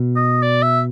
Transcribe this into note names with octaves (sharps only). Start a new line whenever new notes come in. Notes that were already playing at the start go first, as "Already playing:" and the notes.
Already playing: B2
D#5
D5
E5